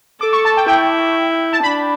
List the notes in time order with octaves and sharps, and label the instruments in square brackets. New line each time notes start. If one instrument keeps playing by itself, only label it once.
[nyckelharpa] A4 [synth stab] D6
[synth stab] C#6
A5
G5
[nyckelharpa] E4 [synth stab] G5
[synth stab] A5
[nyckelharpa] D4 [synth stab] B5